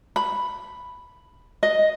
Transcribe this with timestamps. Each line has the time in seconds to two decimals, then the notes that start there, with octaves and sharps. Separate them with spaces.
0.16 B5
1.63 D#5